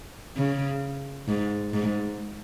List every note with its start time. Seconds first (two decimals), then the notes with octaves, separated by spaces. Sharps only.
0.36 C#3
1.28 G#2
1.74 G#2